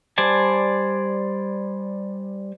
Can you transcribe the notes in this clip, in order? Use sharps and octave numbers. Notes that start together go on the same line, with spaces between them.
G3 C5 D5 G#5 A5